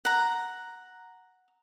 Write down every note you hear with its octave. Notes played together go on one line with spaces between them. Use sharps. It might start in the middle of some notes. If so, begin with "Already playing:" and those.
F#5 A#5